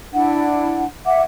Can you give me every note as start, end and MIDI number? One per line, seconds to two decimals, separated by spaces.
0.12 0.84 62
0.12 0.84 64
0.12 0.84 78
1.05 1.21 76
1.05 1.21 78
1.05 1.21 86